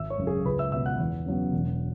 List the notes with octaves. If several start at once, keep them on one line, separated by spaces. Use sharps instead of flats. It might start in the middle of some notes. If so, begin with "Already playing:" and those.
Already playing: G#1 E5 E6
C#5 C#6
F#2 C#3
G#4 G#5
C#2 B4 B5
E5 E6
B2 B3 E5 E6
F#5 F#6
E2
C#3 F#3 B3
E1